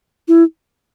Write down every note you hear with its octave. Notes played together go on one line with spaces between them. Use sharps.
E4